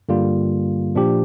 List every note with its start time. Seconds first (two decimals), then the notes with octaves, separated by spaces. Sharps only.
0.09 G2 D3 G3 A#3 F4
0.95 A#2 F3 D4 G4